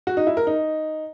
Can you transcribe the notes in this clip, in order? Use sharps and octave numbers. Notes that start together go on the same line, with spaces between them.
F#4
D#4
E4
A#4
D#4